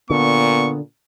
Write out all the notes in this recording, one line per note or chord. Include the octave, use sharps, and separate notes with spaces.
A#2 D3 B3 C#6